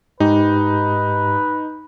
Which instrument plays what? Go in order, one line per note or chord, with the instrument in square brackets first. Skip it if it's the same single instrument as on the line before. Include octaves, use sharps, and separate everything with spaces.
[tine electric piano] G#2 G4 [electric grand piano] D#4 [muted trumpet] B4